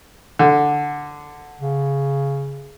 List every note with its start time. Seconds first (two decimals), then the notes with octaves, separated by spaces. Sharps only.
0.39 D3
1.60 C#3